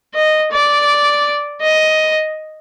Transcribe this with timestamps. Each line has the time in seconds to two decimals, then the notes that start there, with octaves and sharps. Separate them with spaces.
0.14 D#5
0.51 D5
1.62 D#5